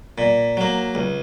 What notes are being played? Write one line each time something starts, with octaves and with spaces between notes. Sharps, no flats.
A#2
F#3 A#3
C#2